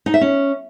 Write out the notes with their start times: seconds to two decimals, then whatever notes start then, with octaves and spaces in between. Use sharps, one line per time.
0.06 D#4
0.14 E5
0.21 C#4